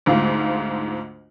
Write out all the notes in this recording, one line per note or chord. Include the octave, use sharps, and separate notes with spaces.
D2 G#2 F4